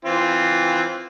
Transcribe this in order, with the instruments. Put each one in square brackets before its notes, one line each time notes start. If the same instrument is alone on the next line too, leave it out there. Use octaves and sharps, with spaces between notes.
[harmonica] E3 C4 F4